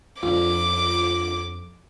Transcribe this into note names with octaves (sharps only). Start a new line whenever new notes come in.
F2 D4 F4 D6